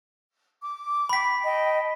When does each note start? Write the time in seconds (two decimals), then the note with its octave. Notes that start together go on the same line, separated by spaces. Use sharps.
0.62 D6
1.09 G5 B5 B6
1.44 D#5 G5 A5